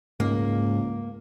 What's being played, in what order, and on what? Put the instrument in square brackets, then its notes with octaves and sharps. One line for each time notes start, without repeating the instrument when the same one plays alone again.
[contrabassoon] C#2 [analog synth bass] G#2 [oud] A#3 A#4